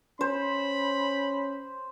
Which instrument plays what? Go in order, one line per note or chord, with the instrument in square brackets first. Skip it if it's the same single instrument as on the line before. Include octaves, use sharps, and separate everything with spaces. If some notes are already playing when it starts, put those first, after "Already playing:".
[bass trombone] C#4 [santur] C5 [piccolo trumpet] B5